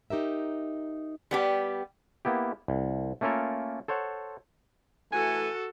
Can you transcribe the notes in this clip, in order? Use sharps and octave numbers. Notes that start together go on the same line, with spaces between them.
D#4 G4 A#4 E5
G3 B3 G4
A#3 B3 E4 G4
C2
A3 A#3 C#4 F4 A4 A#4
A4 C5 C#5 F#5
E3 A3 F#4 A4 G#5